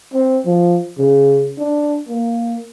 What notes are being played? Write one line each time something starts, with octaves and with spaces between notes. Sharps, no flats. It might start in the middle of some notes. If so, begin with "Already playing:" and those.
C4
F3
C#3
D4
A#3